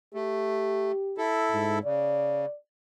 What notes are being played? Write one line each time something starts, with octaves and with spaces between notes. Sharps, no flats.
A3 G4
E4 A4
G#2
C#3 D5